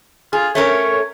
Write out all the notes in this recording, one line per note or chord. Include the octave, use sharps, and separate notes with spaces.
F4 G#4
A3 C#4 A#4 C#5